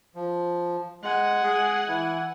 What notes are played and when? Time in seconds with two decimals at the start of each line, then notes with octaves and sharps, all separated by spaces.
0.15 F3
1.03 G#3 F#5 G#5
1.43 G#3 G#4
1.88 E3 E4